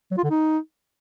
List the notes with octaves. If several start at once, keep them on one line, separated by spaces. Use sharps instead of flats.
F#3
F4
D3
D#4